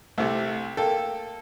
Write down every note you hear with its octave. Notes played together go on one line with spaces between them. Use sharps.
C2 C3 A3
A#3 A4 G5